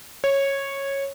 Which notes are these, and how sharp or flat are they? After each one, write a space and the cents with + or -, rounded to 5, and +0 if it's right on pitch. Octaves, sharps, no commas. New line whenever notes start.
C#5 -10